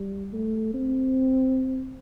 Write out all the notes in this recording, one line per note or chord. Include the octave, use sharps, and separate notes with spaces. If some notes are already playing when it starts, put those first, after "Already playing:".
Already playing: G3
A3
C4